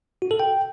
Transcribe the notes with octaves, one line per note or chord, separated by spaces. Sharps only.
F#4
A4
G5